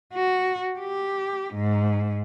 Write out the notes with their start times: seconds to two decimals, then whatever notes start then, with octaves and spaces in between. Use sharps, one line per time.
0.13 F#4
0.79 G4
1.54 G#2